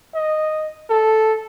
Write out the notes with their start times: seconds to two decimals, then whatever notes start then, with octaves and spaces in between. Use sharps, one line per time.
0.14 D#5
0.90 A4